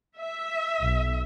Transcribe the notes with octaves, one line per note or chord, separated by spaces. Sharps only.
E5
B1